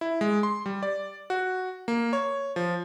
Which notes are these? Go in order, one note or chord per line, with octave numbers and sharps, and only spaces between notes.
E4
G#3
C6
G3
D5
F#4
A#3
C#5
F3